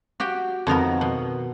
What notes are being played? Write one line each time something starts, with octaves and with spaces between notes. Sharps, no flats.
F#4 G4 G5
F2 D#3 B3 A#4
B2